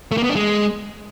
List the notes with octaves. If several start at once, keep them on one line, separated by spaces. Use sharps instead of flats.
A3
A#3
B3
D4
G#3